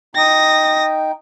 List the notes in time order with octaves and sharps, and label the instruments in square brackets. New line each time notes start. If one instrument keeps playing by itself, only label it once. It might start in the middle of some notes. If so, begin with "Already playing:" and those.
[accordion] D#4 G5 [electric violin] D#6 A#6